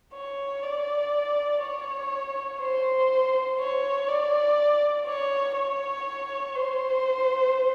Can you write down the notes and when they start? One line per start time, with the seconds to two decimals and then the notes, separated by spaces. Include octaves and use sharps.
0.14 C#5
0.63 D5
1.62 C#5
2.60 C5
3.59 C#5
4.08 D5
5.07 C#5
5.56 C#5
6.55 C5